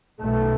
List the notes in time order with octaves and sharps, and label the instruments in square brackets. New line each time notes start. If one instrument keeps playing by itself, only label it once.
[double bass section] B1 B2 A3